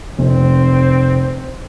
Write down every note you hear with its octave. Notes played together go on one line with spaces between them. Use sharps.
F1 C4